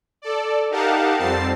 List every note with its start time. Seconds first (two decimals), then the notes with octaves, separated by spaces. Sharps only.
0.22 A4 D5
0.70 D#4 G4 A#4 F5 F#5 A5
1.18 F2 G3 C4 A5 A6 C7